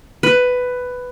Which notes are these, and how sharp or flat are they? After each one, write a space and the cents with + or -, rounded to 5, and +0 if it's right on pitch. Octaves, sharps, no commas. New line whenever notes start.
B4 +10